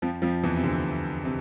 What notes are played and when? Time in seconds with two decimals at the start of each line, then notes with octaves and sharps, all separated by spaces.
0.02 F2 F3
0.22 F2 F3
0.44 E2 E3
0.57 C3
0.64 D2 D3
1.25 C3